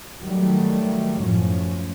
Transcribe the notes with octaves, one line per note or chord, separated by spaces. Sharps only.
D#3 F#3 G3 A3
F#2 A2 F3 C#4